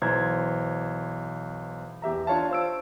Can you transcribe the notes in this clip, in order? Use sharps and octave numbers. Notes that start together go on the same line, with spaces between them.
B1 E3 C5 A#5 G#6
E2 G4 E5 A#5
D4 F4 C#5 F5 A5
C5 E6 D7